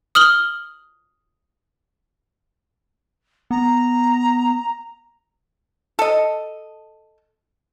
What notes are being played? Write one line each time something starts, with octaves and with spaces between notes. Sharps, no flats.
D#6 F6 F#7 G7
B3 A#5
A4 D#5